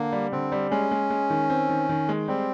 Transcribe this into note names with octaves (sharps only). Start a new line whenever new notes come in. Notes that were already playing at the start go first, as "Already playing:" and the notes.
Already playing: D3 A#3
G3
D3 C4
G3
G#3 C#4
G#3
G#3
D#3
C4
D#3
D#3
G#3
G3 C4